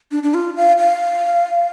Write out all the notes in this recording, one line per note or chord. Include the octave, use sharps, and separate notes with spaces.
D4
D4
F4
F5
F5